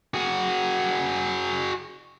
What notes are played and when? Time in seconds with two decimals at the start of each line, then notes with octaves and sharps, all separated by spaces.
0.14 F#4 G#4